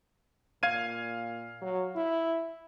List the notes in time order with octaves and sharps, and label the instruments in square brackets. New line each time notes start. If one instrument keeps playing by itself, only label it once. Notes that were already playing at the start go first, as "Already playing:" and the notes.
[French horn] A#2 [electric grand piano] F5 G#6 D#7
[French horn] F#3
E4